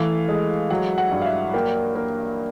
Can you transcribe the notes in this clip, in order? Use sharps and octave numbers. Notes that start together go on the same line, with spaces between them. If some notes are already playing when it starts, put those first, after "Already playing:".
Already playing: E3 A3 F5
G#3
F#3 F#5
F#5
G2
F5
E5
A#3 G5
A#3